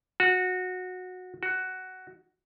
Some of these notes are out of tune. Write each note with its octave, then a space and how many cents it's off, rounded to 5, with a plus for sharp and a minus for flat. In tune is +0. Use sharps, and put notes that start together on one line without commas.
F#4 -15
F#4 +10